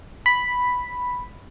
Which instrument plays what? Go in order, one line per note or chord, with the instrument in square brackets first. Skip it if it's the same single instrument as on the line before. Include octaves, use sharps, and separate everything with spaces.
[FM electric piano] B5